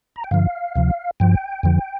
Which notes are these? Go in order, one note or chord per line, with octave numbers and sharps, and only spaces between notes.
A#5
G5
G2 D3 F3 F5
D2 C3 F3
G2 F3 G5
F2 D3 F3